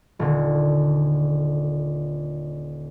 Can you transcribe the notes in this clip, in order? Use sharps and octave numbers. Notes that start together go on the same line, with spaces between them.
D#1 D3